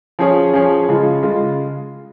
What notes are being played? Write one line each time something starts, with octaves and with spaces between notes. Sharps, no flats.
F3 C#4 G#4 C#5
F3 C#4 G#4 C#5
C#3 G#3 F4
C#3 G#3 F4